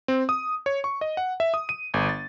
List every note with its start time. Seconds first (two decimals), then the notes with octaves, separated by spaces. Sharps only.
0.08 C4
0.29 D#6
0.66 C#5
0.84 C#6
1.01 D#5
1.17 F#5
1.40 E5
1.54 D#6
1.69 D#7
1.94 G1
2.09 A6